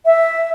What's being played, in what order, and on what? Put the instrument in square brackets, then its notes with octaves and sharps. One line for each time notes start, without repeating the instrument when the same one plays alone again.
[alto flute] E5